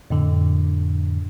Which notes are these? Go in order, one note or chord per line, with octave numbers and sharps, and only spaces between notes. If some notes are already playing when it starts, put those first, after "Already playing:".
F2 A2 D3